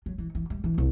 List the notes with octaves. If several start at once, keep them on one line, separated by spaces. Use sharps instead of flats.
F#3
E3
E3
G3
E3
C2